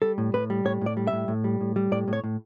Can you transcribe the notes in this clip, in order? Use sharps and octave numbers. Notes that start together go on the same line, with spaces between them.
G3 A4
A2
A2 B4
G3
A2 C#5
A2 D5
G3
E5
A2
A2
G3
A2
G3
A2 D5
A2
C#5
A2